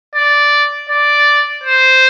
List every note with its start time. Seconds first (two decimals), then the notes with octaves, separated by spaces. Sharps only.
0.15 D5
0.90 D5
1.64 C5